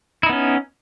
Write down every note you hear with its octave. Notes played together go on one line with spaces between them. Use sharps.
B3 C#4 D#4 E4